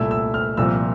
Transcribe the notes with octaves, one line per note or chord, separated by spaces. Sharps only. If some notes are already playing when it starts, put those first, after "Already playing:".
Already playing: C2 A#2 A3 E4 E6
E6
F6
C2 A#2 F3 C4 E6